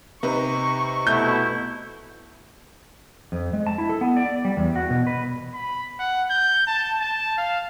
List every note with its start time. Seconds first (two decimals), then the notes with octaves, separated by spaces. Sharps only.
0.23 C3 D#4 B4 C#6
1.07 B2 A3 E4 G6
3.32 F2
3.53 G#3
3.67 A5
3.78 E4
3.89 A4
4.01 B3
4.17 D5
4.45 G3
4.57 E2
4.76 F#4
4.90 B2
5.07 B4
5.54 B5
5.99 F#5
6.30 G6
6.67 A5
7.01 A5
7.38 F5